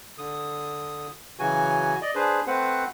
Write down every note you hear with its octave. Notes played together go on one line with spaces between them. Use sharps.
D3 D#6
C#3 E3 F#3 F#4 G#5
D5 D#5
D4 G#4 B4 C5
A3 C4 B4 C5 F#5